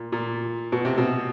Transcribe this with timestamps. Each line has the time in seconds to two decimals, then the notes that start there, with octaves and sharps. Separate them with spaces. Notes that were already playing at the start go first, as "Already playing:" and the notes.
Already playing: A#2
0.12 A#2
0.72 B2
0.85 C3
0.98 B2